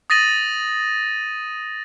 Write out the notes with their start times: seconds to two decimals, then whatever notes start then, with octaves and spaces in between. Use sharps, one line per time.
0.10 D#6 A6 A#6 D#7 F#7